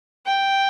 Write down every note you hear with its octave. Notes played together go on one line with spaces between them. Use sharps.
G5